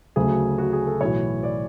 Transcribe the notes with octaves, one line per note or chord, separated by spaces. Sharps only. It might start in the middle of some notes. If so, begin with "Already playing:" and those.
D2 C#3 F#3 A3 G#4
F#4
G#4
A4
B1 A2 E3 C#5
D5